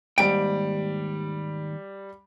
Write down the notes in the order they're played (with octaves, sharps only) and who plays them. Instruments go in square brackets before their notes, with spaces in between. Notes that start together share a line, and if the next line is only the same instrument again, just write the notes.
[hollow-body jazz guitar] D#2 G#2 G5 [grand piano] G3 D7